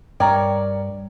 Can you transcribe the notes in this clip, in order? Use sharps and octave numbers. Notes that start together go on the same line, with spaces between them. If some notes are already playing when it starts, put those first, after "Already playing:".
G2 G3 A#4 C#5 D5 G5 A#5